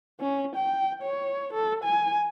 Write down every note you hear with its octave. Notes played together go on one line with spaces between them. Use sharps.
C#4
G5
C#5
A4
G#5